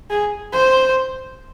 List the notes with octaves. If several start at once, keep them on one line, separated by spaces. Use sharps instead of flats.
G#4
C5